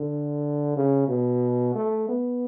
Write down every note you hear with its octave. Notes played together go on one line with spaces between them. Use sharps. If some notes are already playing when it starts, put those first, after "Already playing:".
Already playing: D3
C#3
B2
A3
B3